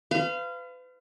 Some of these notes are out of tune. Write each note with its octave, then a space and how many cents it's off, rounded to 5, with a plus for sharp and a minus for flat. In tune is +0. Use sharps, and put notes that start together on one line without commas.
B4 +40 F5 -20